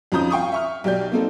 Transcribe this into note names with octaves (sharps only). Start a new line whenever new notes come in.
F2 F3 C#4 A#5 D#6 G6
F5 G5 C#6 D#6
E5 C#6 F6
B1 G4 D5 G6
A#3 C4 D#4 A4